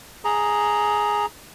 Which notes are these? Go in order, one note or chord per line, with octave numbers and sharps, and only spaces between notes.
G#4 A#5